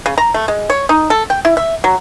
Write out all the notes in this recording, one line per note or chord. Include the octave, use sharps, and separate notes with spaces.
C#3
A#5
A3
G#3
C#5
D#4
A4
G5
E4
E5
F#3